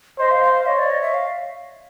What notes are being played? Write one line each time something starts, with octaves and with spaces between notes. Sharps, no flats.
C5 D#5
F5
F5
F5
C#5 D#5
D5
D#5
E5
F5